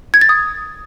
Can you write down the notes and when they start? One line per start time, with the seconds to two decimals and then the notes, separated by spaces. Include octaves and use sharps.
0.14 G#6
0.21 A6
0.29 D#6